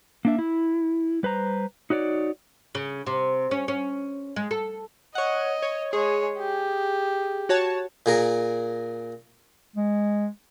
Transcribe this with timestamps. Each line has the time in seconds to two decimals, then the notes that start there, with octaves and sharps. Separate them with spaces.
0.25 A#3 D4 E5
0.39 E4
1.23 G3 B4 C5 A#5
1.90 D#4 F#4 C#5 D5
2.75 C#3
3.06 C3
3.51 C#4
3.68 C#4
4.36 G#3
4.51 A4
5.15 C#5 D#5 F#5
5.62 C#5
5.93 G#3 G#4 C#5
6.39 G4
7.49 F#4 C#5 A5
8.06 A#2 G#4 A#4
9.76 G#3